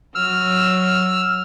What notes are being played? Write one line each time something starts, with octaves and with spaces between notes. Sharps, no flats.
F#3 E6 F6